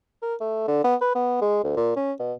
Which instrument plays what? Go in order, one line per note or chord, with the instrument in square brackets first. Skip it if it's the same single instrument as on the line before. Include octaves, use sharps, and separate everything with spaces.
[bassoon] A#4
A3
D3
B3
B4
B3
G#3
D2
A#2
C#4
B2